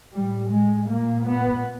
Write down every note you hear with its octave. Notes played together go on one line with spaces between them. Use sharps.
A2 G3
G#3
A#2 A#3
B3